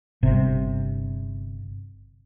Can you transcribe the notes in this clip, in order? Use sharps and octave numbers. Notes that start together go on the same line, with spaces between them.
G1 C3